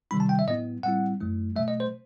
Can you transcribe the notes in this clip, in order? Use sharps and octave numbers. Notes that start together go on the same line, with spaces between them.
C3 D#3 G3 D#4 B5
A5
G5
E5
A2 F#3 B3 E4 D#5
A2 G3 C4 E4 F#5
F#2 F#3 A3 E4
B2 F#3 A3 E5
D#5
C5